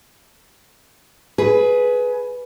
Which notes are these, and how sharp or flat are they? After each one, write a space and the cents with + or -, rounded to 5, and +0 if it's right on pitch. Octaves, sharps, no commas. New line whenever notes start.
G#4 +20 B4 +0